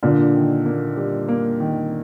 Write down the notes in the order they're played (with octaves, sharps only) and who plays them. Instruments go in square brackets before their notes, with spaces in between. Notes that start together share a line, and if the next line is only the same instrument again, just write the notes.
[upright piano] A#2 D3 [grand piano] A#3
[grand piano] D#3
A#3
G3
A#3
D#3